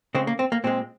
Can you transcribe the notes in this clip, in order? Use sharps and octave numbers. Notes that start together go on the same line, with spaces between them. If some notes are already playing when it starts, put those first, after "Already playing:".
C#3 G#3 C4
A#3
C4
A#3
A#2 G#3 C4